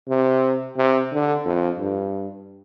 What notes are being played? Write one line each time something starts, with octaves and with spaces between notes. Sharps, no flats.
C3
C3
D3
F2
G2